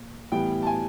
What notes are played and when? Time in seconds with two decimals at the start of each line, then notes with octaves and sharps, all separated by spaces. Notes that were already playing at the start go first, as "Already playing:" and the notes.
Already playing: A#2
0.32 A2 E3 G3 B3 G5
0.63 A5
0.67 G#5